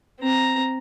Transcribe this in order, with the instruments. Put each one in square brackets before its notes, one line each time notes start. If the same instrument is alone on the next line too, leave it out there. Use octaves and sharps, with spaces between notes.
[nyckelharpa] C4 A#5